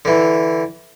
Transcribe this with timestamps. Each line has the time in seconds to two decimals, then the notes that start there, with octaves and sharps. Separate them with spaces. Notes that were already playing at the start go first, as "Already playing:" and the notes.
0.05 D3 E3